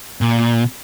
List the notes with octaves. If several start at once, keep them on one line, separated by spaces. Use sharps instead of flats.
A#2